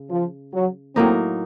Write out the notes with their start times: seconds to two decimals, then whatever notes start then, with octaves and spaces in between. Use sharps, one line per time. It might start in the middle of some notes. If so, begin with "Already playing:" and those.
Already playing: C#3
0.10 F3
0.53 F#3
0.96 A2 F#3 A#3 C4 D#4